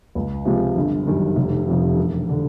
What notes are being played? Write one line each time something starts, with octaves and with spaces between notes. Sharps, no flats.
C#2
C3 F3 G#3
G1
F#2 D#3 G3
F1
F2 C3 F3
E1
D3